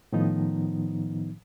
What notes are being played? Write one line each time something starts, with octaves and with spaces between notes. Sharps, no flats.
A2 D#3 F3 B3 D#4